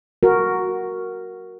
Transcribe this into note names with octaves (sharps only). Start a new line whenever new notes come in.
F#4 A#4